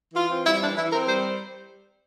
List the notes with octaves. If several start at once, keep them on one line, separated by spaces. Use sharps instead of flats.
E3 F4
C4
G3 E4
E3 D4
E3 E4
C4 A#4
G3 C5